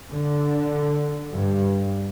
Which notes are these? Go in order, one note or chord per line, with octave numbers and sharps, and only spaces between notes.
D3
G2